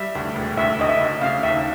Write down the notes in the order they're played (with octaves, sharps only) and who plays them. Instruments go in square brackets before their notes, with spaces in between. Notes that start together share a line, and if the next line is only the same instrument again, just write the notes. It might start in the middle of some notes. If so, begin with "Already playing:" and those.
Already playing: [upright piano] G3 [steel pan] E5
[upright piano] D2
E1
[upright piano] D2 [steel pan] E5
[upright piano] D2 [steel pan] D#5
[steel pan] E5
[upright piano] D2
[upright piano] C#3 [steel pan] F5
[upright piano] D#2 [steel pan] E5